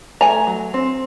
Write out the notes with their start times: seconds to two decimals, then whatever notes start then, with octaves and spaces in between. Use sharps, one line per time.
0.21 A3 G#5 A#5
0.47 F#3
0.74 C4